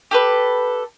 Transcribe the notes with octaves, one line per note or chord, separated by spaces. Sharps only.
G4 A4 B4